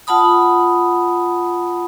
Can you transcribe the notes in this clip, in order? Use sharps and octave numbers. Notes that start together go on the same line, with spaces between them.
F4 F#5 A5 B5 D#6